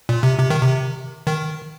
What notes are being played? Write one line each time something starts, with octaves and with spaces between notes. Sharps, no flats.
A#2
C3
C3
D#3
C3
D#3